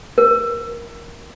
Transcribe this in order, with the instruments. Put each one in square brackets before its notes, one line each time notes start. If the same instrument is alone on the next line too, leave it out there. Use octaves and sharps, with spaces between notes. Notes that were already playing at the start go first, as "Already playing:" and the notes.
[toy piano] A#4